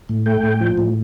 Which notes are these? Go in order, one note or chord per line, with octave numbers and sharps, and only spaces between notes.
A2
A3 G5
A2
F3
A2